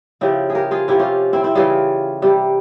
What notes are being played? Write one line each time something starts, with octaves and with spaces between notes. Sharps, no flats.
C#3 F3 E4 G4
G#4
G4 A#4
F4 G#4
C3 F3 E4 G4
C#4 F4
C4 E4
C4 E4
C#3 E3 G3 F4 G#4
C3 G3